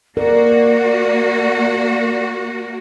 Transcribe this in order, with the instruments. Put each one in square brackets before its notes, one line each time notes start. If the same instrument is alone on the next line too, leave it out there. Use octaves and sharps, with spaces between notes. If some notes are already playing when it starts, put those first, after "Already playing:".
[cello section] A#3 F#4 [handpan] A#4 [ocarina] D5